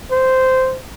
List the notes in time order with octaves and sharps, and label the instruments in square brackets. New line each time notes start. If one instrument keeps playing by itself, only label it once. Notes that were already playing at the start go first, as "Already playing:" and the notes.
[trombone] C5